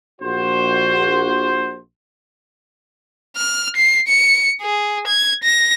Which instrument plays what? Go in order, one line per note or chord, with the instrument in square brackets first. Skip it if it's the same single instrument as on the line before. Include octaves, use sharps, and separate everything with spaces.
[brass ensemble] A#1 F#4 C5
[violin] F6
C7
C#7
G#4
G#6
A#6